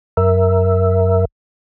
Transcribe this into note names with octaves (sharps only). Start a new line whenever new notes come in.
F#2 A#4 E5